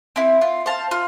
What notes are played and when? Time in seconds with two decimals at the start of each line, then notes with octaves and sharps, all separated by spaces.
0.16 C4 E4
0.41 F4
0.66 C5 F5 A5
0.91 F4